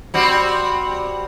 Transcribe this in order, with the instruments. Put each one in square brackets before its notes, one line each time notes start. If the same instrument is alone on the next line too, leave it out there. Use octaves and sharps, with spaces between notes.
[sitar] G3 C4 F#4